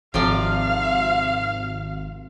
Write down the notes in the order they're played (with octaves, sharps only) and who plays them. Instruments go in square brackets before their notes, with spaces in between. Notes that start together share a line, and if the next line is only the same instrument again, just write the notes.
[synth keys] G#1 [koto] C3 F3 D5 [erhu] F5